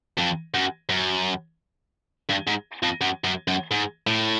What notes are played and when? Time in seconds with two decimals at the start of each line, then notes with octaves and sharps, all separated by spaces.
0.19 F2
0.54 F#2
0.89 F#2
2.30 G2
2.47 G#2
2.83 F2
3.01 F#2
3.24 F#2
3.48 F#2
3.71 G#2
4.07 A2